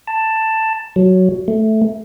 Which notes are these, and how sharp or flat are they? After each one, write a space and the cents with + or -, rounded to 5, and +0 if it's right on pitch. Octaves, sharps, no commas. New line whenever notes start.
A5 +10
F#3 +5
A3 -5